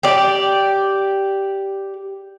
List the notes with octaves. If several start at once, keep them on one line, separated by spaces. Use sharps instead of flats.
G4 D5